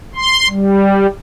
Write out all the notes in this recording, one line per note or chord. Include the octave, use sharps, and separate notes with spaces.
C6
G3